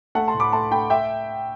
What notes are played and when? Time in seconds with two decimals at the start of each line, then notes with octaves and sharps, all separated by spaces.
0.15 A3 F#5 A5
0.28 A5 C6
0.34 A2
0.40 B5 D6
0.52 A3 A5 C6
0.71 A3 G5 B5
0.90 E5 G5